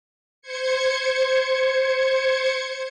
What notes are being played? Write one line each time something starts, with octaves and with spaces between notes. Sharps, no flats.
C5 G#6 C#7